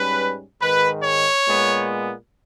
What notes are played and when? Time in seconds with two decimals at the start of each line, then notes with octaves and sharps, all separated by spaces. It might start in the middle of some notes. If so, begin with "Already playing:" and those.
Already playing: G#2 G3 C#4 B4
0.61 G#2 D#3 G#3 B4
1.04 C#5
1.47 A#2 G#3 B3